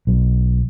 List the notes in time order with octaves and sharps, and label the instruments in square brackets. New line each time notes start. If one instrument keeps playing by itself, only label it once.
[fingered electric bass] B1